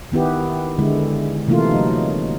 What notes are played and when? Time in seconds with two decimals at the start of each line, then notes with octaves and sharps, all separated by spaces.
0.12 D#3 B3 E4 G4
0.78 D3 G#3 E4
1.48 C3 E3 A3 A#3 F4
1.71 F#3 D#4